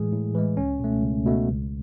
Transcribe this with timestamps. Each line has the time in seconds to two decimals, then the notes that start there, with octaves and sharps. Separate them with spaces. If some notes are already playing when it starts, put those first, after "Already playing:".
Already playing: A2 E3 G#3 G#4
0.12 A2
0.35 E3 G#3
0.57 C#2 C#4
0.80 B2 A3
1.02 C#2
1.26 B2 A3
1.47 C#2